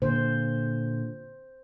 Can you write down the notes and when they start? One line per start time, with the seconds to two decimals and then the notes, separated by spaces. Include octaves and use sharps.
0.02 A#2 D3 C5